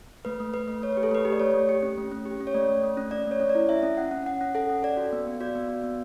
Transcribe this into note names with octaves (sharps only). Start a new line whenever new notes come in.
A3 B4
A3
A3 B4
A3
A3 C#5
G4 B4
A4
A3 B4
G4
D5
A3 C#5
A3
G4
C#4
A3
C#4
G4
C#4
C#5
A3 D5
A3
A3
C#4
C#4 D5
A3 C#5
C#4
D5
E4
E4 E5
C#4
C#4 F#5
C#4
C#4 F#5
C#4
A4 F#5
C#4
A4 D5
F#4
B3
B3
F#4 D5
B3
F#4
B3